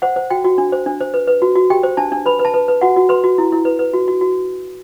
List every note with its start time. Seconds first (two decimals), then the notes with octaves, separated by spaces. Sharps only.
0.02 C5 F#5
0.16 C5
0.30 F#4 G5
0.45 F#4
0.58 D4
0.72 C5
0.86 D4
1.01 C5
1.14 B4
1.28 B4
1.42 F#4
1.56 F#4
1.70 G4 G5
1.83 C5
1.97 D4 A5
2.12 D4
2.26 B4 B5
2.39 B4
2.45 A5
2.54 B4
2.68 B4
2.81 F#4 F#5
2.96 F#4
3.09 B4 C6
3.24 F#4
3.38 E4
3.52 E4
3.65 B4
3.79 B4
3.94 F#4
4.08 F#4
4.21 F#4